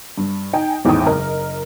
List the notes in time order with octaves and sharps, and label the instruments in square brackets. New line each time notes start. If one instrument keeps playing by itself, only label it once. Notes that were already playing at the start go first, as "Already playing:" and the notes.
[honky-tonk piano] G2
D#4 G5 G#5
G#1 E2 A2 D#4 G5 D#6
F#1 A#4 D#5